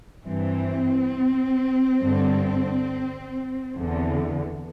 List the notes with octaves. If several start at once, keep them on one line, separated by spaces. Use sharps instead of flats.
G2 E3 C4
G2 D3
E2 D3